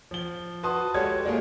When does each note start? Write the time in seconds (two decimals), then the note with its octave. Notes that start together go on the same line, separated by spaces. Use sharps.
0.11 F3 G7
0.63 F#4 B4 A5 C6 D#6
0.94 G#3 F#4 G4 A4 C#5 G#6
1.26 G#3 A#3 F4 G4 G#4